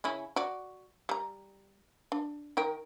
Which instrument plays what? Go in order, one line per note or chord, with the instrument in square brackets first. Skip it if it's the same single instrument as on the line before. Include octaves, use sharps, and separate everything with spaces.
[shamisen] C#3 C#4 E4
F#4 D5
G3 A#5
D4
D#3 A#4 G5